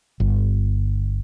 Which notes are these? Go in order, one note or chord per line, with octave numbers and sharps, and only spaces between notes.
G1